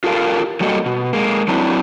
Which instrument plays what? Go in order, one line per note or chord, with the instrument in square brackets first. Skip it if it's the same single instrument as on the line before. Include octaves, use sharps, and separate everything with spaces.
[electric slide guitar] F4 G4 A4 A#4 D5 F5
F#3 G3 A#3 F#4 A4 D#5
B2
G#3 A#3
F#3 C4 D4 E4